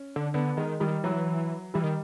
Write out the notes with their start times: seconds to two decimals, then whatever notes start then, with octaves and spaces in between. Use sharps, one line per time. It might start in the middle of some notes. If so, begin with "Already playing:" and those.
Already playing: C#4
0.16 D3
0.34 D3 B3
0.57 D#3 G#3
0.80 D#3 G3
1.04 E3 F#3
1.74 E3 G3
1.84 D#3